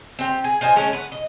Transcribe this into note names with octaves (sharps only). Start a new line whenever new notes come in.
C4 G4
G#4
F4 C5 D#5 G#5
G#3 A3 C#4
B4 F#5
D#5